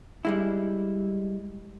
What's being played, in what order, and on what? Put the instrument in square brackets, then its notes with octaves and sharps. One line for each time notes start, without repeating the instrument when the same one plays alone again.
[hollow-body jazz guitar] G3 G#3 E4